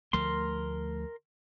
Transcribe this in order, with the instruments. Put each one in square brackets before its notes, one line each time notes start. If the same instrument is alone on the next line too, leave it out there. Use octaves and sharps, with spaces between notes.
[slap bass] D2 F3 A3 [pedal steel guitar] A#4 C6